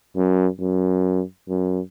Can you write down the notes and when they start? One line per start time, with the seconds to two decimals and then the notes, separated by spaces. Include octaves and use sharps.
0.16 F#2
0.60 F#2
1.49 F#2